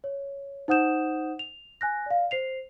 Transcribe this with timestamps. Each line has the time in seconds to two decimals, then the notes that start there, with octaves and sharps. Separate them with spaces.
0.04 C#5
0.68 D#4 C5 F#5 D#6 G6 E7
1.39 F7
1.81 G#5 F#6 A#6
2.06 D5 F5
2.31 C5 C7 F7